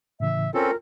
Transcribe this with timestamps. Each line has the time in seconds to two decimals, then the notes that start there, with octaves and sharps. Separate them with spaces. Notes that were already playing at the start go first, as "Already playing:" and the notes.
0.20 A2 C#3 E3 E5
0.54 C4 C#4 F4 A4 A#4